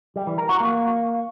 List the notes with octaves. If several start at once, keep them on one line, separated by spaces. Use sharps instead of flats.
G3
E3
A#4
F#4
A#3